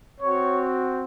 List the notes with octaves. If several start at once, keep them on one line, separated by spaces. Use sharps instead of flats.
C4 F#4 C#5